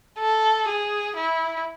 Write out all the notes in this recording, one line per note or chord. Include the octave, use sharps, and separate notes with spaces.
A4
G#4
E4